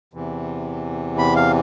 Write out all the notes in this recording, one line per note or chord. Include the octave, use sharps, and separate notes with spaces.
E2 C3 E3
B5
F5